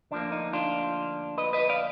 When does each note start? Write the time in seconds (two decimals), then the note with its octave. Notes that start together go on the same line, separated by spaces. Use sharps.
0.11 D2 D3 F3 A#3 D4
0.32 D#4
0.53 D4 F4
1.38 B4 D#5
1.53 B4 D#5
1.69 D5 F5